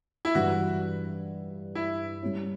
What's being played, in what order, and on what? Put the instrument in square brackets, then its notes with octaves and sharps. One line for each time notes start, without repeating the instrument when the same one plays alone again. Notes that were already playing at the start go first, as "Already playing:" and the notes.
[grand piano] E4
[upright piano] G2 E3 G3 [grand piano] F#4
[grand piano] E4
[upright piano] G3 C#4 E4